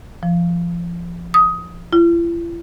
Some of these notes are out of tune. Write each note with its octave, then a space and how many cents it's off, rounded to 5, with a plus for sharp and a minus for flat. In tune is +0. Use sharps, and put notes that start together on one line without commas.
F3 -25
D#6 +15
E4 +45